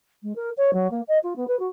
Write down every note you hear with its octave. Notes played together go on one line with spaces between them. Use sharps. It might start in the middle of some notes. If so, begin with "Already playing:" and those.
G#3
A#4
C#5
F#3
A#3
D#5
F4
B3
B4
F#4